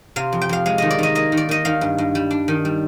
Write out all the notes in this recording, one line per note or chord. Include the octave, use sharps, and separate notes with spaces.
C3 F5
F2
G5
F2 F5
G#3 F5
D#3 D#5
D5
D#3 D#5
A#3 D#5
D#3
D5
D#3 D#5
D#3 F5
G2
G2
G3
D4
D#3
G3